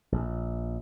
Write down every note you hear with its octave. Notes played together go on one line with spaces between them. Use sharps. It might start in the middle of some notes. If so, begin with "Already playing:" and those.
A#1